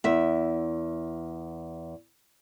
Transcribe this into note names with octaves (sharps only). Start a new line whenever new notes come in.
E2 E5